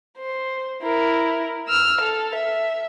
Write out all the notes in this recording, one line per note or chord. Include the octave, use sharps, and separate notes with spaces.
C5
E4 A#4
E6 F6
A4
E5